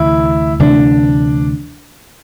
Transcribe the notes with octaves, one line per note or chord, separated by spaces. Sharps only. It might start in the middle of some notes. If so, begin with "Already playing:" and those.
Already playing: D2 C3 E3 A3 E4
D2 C3 E3 A3 D4